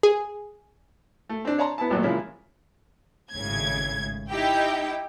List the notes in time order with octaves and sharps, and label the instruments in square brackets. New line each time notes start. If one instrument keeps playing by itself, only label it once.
[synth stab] G#4
[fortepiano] A3
C4 D4
C#5 D5 A5 A#5 C6
B3 E4 A5
G#1 A#2 F#3 A3
C#3 F3 G#3 A#3 C#4 E4
[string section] G#1 A2 C#3 G#6
D#4 E4 G4 G5